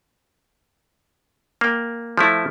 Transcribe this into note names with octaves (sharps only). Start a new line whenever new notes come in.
A#3 G5
F3 A3 E4